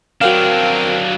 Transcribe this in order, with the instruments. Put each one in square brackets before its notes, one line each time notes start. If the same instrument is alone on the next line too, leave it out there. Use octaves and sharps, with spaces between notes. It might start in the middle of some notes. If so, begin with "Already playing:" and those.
[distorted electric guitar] F#3 D4 [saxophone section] C4 A#4 [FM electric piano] F#4 F5